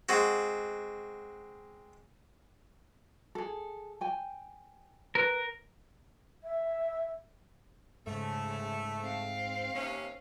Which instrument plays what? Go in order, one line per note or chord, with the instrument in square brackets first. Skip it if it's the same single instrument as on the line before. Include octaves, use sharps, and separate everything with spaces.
[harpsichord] G#3 C4 F#4
[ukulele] G#4 A4
G5 G#5
[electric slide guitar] A#4 [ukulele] B4
[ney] E5
[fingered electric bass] G#2 [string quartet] C#3 [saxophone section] A3
[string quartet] C4 F5
[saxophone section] D#2 C3 C#4